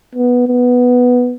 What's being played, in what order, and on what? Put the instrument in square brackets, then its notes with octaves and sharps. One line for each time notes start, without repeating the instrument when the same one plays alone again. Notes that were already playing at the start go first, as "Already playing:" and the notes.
[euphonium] B3
B3